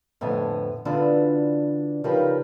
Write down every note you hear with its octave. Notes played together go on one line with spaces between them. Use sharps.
F2 A2 D3 B3 G#5
D3 E3 B3 D4 F4 F#4
C#3 F3 G3 D#4 A#4 B4